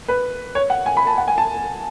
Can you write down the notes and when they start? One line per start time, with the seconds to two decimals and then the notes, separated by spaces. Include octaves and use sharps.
0.08 B4
0.55 C#5
0.70 F#5
0.86 G#5
0.97 B5
1.07 A5
1.18 F#5
1.28 G#5
1.38 A5